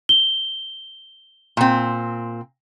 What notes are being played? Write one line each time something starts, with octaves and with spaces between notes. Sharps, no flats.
G7
A#2 C4